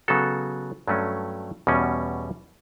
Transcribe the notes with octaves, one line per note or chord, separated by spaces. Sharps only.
C#3 F#3 B3 F#4 A4
G2 F#3 A3 C#4
E2 B2 G3 C#4